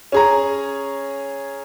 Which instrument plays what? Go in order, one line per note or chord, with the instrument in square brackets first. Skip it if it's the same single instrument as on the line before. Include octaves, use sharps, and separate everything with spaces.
[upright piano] C#4 G#4 A#5